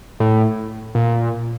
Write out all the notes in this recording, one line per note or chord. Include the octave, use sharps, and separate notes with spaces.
A2
A#2